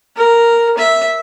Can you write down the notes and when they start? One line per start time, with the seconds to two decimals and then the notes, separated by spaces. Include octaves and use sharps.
0.16 A#4
0.78 E5